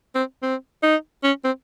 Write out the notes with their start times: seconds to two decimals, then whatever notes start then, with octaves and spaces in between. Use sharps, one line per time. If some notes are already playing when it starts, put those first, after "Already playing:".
0.15 C4
0.43 C4
0.83 D#4
1.24 C#4
1.44 C4